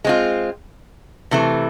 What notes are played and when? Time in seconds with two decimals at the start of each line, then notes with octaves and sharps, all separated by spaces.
0.05 G#3 C4 F4
1.31 C3 E3 A3